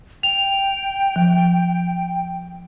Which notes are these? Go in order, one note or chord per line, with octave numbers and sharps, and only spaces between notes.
G5 F7
F3